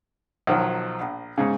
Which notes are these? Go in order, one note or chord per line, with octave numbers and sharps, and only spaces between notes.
B1 D#3 F3 F#3
A#1
G#2 C#3